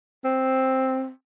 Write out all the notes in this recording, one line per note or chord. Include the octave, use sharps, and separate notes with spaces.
C4